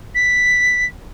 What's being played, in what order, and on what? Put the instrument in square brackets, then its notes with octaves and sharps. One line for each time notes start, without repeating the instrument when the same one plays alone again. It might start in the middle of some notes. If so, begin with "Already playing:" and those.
[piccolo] B6